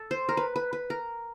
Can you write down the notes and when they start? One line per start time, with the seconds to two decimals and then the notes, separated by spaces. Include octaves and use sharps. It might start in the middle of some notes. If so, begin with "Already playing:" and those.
Already playing: A4
0.11 C5
0.29 A#4
0.37 B4
0.56 B4
0.73 B4
0.90 A#4